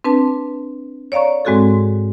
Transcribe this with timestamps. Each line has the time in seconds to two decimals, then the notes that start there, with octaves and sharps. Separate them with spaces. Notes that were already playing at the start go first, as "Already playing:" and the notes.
0.04 C4 D4 B4 A5
1.12 C#5 D5 F5 A#5 C#6
1.45 G#2 G#3 C4 F#4 G#4 A4